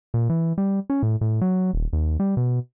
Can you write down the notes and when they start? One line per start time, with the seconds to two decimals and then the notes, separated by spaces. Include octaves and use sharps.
0.14 A#2
0.29 E3
0.58 G3
0.90 C#4
1.03 A2
1.21 A2
1.41 F#3
1.73 D#1
1.93 D#2
2.20 G3
2.37 B2